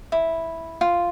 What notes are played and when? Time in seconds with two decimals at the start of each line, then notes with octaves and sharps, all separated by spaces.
0.12 E4
0.81 F4